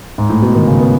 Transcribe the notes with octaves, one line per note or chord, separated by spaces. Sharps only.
G#2
A2
B2
D#3
C#3
B3